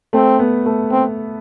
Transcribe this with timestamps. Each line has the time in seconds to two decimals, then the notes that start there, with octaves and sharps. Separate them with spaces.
0.13 A3 C4
0.39 B3
0.66 A3
0.91 C4